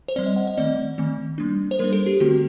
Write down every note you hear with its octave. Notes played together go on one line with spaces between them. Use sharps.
C5
G3 C4 D5
D#5
F#5
D#5
D#3 A3 C4 D5
D#3 A3 C4
G3 A#3 D4
C5
G3 A#3 D4 A#4
A4
G4
D3 A3 C4 F#4